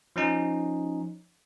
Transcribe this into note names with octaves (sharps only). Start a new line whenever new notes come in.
F3 C#4 D#4